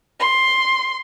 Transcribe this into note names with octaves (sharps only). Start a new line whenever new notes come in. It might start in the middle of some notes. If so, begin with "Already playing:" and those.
C6